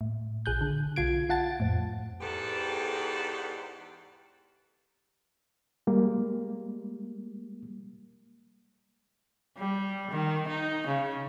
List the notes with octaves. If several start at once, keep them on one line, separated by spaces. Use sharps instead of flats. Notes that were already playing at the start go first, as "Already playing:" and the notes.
A2
A#1 G#4 F#6 G6
D3
B1 D3 F4 G#6 D7
F4 F#5 A5 A6
F2 A2
E2 G#2 B3 G4 A4
G3 G#3 A#3
G3
D#3
D#4
C#3